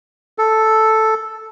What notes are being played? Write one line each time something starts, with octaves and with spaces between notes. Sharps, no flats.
A4